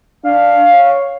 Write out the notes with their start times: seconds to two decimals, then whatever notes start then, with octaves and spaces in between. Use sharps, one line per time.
0.24 D4 F5
0.71 C#5